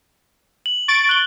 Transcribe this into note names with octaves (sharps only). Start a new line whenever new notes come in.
F#7
C#6 A6 D7
F#6 F#7 G7